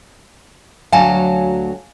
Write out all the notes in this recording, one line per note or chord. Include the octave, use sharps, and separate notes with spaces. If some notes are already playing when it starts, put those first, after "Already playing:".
D2 F#3 F5 G#5 A5